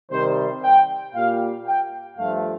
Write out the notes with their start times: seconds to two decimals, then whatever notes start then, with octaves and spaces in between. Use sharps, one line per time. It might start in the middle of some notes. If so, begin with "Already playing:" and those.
0.11 C3 D#3 G3 C5
0.63 G5
1.15 A#2 G3 F5
1.66 G5
2.17 G2 F3 A3 F5